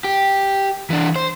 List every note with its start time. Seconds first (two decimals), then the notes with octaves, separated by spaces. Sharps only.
0.04 G4
0.90 E3 D4
1.16 C5